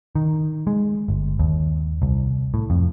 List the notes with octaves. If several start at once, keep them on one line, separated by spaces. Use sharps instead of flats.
D#3
G#3
G1
D#2
C2
A2
F2